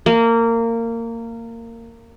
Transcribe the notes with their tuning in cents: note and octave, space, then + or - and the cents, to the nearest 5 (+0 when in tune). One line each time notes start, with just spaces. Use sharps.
A#3 -20